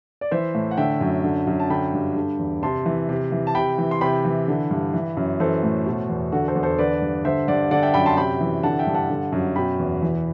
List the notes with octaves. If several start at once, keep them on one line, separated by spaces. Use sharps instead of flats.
D5
E3 C5 E5
A2
F#5
D3 E5 G5
F#2
D3
F#2
A5
D3 G5 B5
G2
D3
E2
C3 A5 C6
E3
C3
E3
A5
C3 G5 B5
E3
C6
C3 G5 B5
E3
D3
G2
E3
F#2
E3 A4 C5
A2
B2
E2
D3 F#4 A4
A4 C5
E2
A4 C5
D3 B4 D5
G2
D3 C5 E5
G2 D5 F#5
D3 D5 F#5
E5 G5
F#2 G5 B5
A5 C6
C3 G5 B5
E3
D3 F#5 A5
E5 G5
G2
F#5 A5
D3
F#2
B2 G5 B5
E2
E3